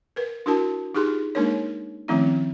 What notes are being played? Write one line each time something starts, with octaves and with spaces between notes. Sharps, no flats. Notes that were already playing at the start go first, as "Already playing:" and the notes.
A#4 B4
D4 E4 F#4 A#4 A5
D#4 F4 G4 G#4 C6
G#3 A#3 D4 D#4 A#4 C#5
D#3 F3 A3 C4 C#4 E4